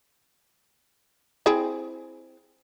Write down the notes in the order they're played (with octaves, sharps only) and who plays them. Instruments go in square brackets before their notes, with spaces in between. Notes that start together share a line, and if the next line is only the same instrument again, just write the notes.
[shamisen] C4 E4 G#4